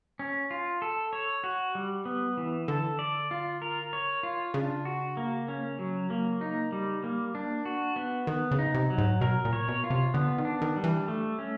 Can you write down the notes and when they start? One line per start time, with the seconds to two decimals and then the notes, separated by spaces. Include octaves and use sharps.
0.19 C#4
0.51 F4
0.82 A4
1.13 C#5
1.44 F#4
1.75 G3
2.05 B3
2.37 E3
2.68 D3 A4
2.99 D5
3.31 F4
3.62 A#4
3.93 C#5
4.23 F4
4.54 C#3 D4
4.85 F#4
5.17 A#3
5.48 C#4
5.79 F#3
6.10 A#3
6.41 D#4
6.72 G3
7.04 A#3
7.35 D4
7.65 F#4
7.96 B3
8.27 D#3 B3
8.51 C#3
8.59 D#4
8.74 C3
8.90 F#3
8.98 G#2
9.21 B2 A#4
9.45 A#2
9.53 C#5
9.68 B2
9.84 F4
9.90 C3
10.14 D3 B3
10.38 D#3
10.45 D4
10.62 D#3
10.76 G3
10.84 E3
11.08 A3
11.39 C#4